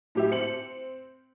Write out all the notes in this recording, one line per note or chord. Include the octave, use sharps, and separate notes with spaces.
A2 G4 E5
C4 C#7 F#7